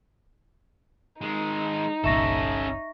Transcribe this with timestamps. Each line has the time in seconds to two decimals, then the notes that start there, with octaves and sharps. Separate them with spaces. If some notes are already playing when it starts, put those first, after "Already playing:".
1.21 D#3 G#3 D#4
2.04 G1 C2 A#2 C#4 A4 E5 C#6 A#6